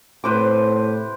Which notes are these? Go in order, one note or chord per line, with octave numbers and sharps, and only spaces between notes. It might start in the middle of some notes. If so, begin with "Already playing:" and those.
A2 C3 B4 C5 D6